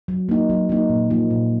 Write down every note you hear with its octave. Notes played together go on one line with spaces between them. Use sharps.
F#3
A#3 D#4
F#3
A#3 D#4
A#2
F3 A#3 D#4
A#2